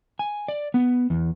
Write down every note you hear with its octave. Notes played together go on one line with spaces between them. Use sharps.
G#5
D5
B3
E2